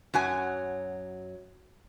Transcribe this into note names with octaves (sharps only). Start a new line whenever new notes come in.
F#2 F#3 G#5